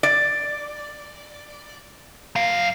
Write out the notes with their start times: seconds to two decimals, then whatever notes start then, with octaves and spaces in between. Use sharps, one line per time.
0.03 D5
2.36 F#2 F5